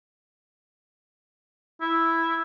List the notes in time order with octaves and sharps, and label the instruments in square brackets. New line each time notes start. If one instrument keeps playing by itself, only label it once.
[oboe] E4